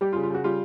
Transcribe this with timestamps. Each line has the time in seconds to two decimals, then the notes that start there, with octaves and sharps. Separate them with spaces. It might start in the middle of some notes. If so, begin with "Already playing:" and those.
0.01 G3 G4
0.13 F4
0.16 C#3
0.23 F4
0.30 C#3 F#4
0.44 G3 F4